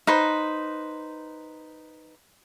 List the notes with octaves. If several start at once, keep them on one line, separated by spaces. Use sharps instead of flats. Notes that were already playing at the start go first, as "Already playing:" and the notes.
D#4 B4 C5